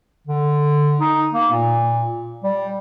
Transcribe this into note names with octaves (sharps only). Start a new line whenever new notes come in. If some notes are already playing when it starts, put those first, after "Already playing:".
D3
D#4
A#3
A#2
G3